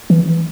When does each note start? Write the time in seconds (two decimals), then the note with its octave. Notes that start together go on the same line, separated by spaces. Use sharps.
0.10 E3